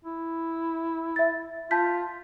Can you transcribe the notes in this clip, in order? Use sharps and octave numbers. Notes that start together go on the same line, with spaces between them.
E4
E5 A6
F4 A5 G6 B6